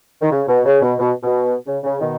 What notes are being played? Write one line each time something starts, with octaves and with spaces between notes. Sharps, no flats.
D#3
C#3
B2
C#3
B2
B2
B2
C#3
C#3
B2 D#3